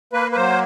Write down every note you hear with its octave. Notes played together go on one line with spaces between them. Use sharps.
A#3 B4
B4
F#3 C5